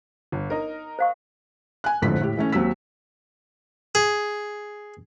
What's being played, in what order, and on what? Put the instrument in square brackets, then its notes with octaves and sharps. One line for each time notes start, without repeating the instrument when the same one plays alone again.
[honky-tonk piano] G1
D#4 A#4
[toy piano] C5 F5 C#6
[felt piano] G#5 F#6
A1 F2 G#2 D3 B6
A2 G4
E3 A3 C#4
D#2 F#3 C4 E6 B6
[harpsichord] G#4